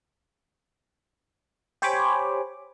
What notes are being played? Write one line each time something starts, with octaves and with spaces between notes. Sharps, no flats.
G4 C5 C#5 G#5 B5 D6